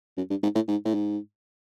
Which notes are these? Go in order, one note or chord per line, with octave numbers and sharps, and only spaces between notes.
F#2
G2
G#2
A2
G#2
A2
G#2